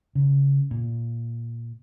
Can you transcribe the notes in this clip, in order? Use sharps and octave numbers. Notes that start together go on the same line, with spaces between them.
C#3
A#2